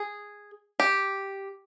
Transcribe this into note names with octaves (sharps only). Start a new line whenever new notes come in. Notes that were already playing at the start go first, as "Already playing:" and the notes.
Already playing: G#4
G4